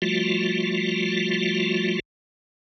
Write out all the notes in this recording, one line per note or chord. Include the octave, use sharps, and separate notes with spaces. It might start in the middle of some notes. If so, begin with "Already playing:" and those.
F3 G3 A3 F4 F#4